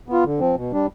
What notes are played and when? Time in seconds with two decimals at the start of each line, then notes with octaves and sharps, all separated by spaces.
0.09 B3 F4
0.24 D3
0.40 F3 C4
0.56 B2
0.72 G3 D4